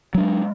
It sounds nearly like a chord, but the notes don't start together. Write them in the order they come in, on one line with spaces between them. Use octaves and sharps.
F#3 D4 G#3